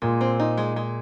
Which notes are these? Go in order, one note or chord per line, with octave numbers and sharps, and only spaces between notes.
A#2 G#3
C4
D#4
G#3
G#3